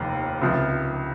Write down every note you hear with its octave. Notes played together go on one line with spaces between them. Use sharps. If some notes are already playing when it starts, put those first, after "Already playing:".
Already playing: F1 D#2
C#2 C3 F3